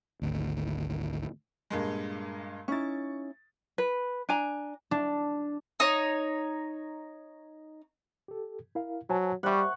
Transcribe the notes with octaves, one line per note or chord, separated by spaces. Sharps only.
G#1 D2
G2 A#2 G#3
C#4 D#4 E4 C#6 A6
B4
D4 G#5 A#5
D4
D#4 C#5
G4 A4
E4 A#4 F5
F#3 C5 G#5 A5
G3 C5 E5 F#5 C#6